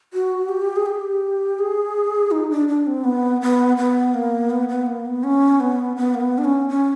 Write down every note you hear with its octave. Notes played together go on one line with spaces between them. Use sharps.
F#4
G4
G#4
G4
G#4
D#4
D4
D4
C4
B3
B3
B3
A#3
B3
B3
A#3
B3
C#4
B3
B3
A#3
B3
D4
C#4
C#4